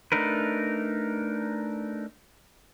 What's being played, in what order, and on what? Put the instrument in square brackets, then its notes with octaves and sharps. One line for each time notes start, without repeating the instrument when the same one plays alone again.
[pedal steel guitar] A3 D4 D#4 A#4 B4